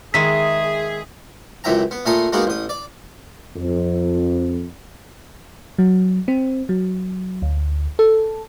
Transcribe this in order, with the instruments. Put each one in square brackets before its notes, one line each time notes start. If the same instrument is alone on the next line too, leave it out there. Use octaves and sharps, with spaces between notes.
[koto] D#3 G#3 [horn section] G#4 [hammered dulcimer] E5 [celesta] B6
[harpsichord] C#2 F#2 E3 E5 G5 A#5
B3
A#2 A3 G#5 A#5 C6 D#6
G#3 A#3 B3 D#4 F#4 G#4
A1 D#6
D5
[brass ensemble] F2
[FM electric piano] F#3
C4
F#3
D2
A4